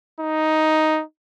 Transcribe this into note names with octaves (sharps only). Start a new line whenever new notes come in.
D#4